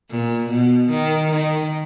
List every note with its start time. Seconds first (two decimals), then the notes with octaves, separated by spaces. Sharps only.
0.10 A#2
0.50 B2
0.90 D#3
1.31 D#3